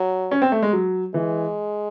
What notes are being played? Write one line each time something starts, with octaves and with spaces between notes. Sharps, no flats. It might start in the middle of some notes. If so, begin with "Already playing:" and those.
Already playing: F#3
C#4
C4
A3
G#3
F#3
E3 G#3